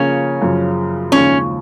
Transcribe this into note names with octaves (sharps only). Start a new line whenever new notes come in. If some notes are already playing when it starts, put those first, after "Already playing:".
Already playing: C#3 F3 A#3 C#4 F4
F#2 C#3 F3
D#2 C#3 F3 G#3 C#4